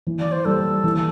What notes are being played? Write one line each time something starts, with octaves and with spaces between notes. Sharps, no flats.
E3
D5
C5
G3 A4
E3